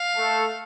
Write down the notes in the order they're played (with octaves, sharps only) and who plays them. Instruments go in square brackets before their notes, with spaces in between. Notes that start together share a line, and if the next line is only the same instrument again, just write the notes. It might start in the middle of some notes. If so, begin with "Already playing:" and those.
Already playing: [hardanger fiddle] F5
[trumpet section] A3 A4